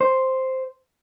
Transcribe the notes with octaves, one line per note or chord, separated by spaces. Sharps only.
C5